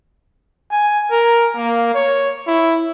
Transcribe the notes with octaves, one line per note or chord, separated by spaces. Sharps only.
G#5
A#4
A#3
C#5
E4